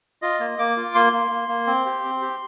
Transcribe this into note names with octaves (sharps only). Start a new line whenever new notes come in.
F4 D#5
A#3
A#3 D6
F4
A#3 C6
A#3
A#3
A#3
C4
G4
C4
G4